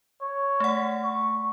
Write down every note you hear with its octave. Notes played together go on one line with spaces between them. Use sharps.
C#5
A3 F#5
C#6